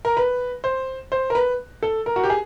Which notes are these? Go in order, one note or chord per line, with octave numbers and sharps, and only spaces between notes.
A#4
B4
C5
C5
A#4
B4
A4
A#4
F#4
G4
G#4